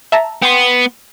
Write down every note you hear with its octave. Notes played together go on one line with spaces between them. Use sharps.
E5 A5 A#5
B3 G5 C6